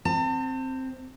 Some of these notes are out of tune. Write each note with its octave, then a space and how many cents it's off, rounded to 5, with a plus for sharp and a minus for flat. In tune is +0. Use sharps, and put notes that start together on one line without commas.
C4 +0 A5 +40